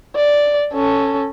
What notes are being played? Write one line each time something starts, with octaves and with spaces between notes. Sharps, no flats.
D5
C#4 A4